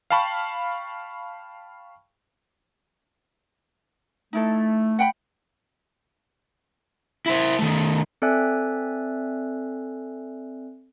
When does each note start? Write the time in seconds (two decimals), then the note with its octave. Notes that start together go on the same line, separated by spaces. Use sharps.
0.10 F5 G5 A5 B5 C#6
4.33 A3 D#4 E4 A4
4.99 F#5 G5 B5
7.26 E4 C5
7.59 D#3 A3
8.22 C4 A4 D5 E5 G#5 F#6